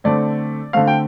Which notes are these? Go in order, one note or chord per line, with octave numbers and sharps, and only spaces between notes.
D3 A3 C4 D5
D3 A3 C4 F5
G5